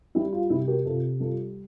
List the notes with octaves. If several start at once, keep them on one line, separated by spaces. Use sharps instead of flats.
G3 E4
F4
C3 E4 G4
G4 A#4
C3 F4 A4
G3 F4 A4